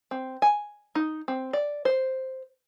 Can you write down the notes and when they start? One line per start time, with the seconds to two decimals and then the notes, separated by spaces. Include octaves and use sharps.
0.11 C4
0.42 G#5
0.95 D#4
1.28 C4
1.53 D5
1.85 C5